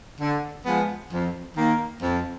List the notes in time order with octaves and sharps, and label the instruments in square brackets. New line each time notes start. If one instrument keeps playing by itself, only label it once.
[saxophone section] D3
F3 G#3 B3
F2
D#3 A#3
F2